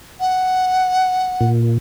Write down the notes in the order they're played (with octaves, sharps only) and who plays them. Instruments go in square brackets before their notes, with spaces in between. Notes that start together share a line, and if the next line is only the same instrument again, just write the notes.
[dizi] F#5
[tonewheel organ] A#2